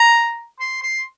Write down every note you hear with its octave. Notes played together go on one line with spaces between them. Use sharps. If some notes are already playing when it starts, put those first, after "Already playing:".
Already playing: A#5
C6
C6